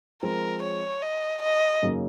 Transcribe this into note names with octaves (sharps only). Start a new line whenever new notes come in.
F3 G#3 C4 A#4
C#5
D#5
D#5
F#2 C#3 F#3 A#3 D#4